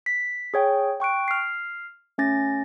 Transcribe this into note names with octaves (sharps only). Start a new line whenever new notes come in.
B6
G#4 C#5 G5
G5 C#6 F#6 D7
F6 C7
A3 C#4 A6 A#6